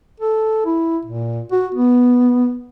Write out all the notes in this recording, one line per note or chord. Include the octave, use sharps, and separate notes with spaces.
A4
E4
A#2
F#4
B3